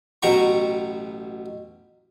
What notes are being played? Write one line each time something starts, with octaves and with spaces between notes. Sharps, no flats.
A1 B2 F#3 G5 A#5 C#6